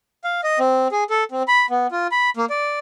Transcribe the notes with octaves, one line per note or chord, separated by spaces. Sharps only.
F5
D#5
C4
G#4
A4
C4
B5
B3
F4
B5
A#3
D5